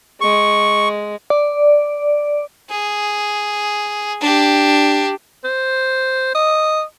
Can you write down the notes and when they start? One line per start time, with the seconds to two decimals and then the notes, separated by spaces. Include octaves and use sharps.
0.21 G#3 C#6
1.30 D5
2.70 G#4
4.21 D4 G4
5.44 C5
6.35 D#5